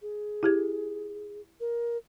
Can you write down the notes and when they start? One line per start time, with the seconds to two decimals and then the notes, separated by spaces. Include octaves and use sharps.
0.02 G#4
0.43 E4 G4 G#6
1.60 A#4